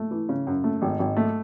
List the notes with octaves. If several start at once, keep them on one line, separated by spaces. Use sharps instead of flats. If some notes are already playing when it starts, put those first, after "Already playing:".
Already playing: A3
E3
C#3
F#2
A3
G#1
G#1
A3